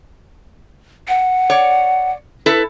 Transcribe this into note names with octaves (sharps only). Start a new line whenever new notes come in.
F#5
C#5 D5
E4 A4 B4